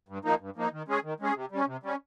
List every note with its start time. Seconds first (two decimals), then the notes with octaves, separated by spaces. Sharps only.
0.09 G2
0.25 F3 A#3 D#4
0.40 G2
0.56 F3 A#3 D#4
0.73 D#3
0.88 G#3 C#4 G#4
1.04 D#3
1.20 G#3 C#4 G#4
1.36 C3
1.51 G3 C#4
1.67 C3
1.83 G3 C#4